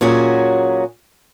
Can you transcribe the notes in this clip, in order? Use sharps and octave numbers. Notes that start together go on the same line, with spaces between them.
A#2 F#3 C#4 F#4 G#4